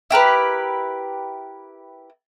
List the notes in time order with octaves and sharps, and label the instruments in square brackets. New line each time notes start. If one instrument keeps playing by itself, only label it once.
[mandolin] E4 G4 A#4 B4